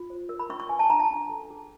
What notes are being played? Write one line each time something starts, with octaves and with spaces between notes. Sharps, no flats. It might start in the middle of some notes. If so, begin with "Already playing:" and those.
Already playing: F4
C5
A#4
B5
C#4 C#6
C#6
B4 G#5
A5
D4 A#5
A5
C#4
A4
G#4